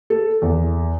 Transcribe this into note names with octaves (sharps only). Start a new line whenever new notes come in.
A4
E2